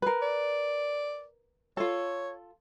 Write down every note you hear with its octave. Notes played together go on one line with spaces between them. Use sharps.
A#4 B4
D5
F4 A4 C#5